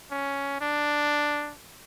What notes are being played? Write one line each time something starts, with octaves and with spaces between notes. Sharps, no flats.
C#4
D4